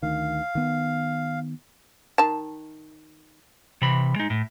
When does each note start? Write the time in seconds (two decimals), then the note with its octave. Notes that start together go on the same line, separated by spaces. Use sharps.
0.03 D2 D#3 F5
0.55 D#3 B3
2.18 D#3 A5
3.82 C3 E3 B5
4.16 G#3 D#4
4.30 A2